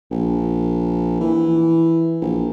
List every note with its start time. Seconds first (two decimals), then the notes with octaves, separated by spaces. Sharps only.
0.11 A#1
1.21 E3
2.22 A#1